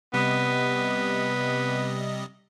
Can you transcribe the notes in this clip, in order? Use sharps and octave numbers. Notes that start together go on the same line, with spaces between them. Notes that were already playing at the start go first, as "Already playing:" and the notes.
C3 G3 B3 D#5